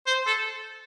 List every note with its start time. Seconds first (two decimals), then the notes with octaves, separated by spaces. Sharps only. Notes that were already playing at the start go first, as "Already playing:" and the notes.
0.07 C5
0.27 A4